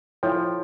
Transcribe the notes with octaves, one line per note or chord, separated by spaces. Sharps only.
F3 E4 A4 C#5 G5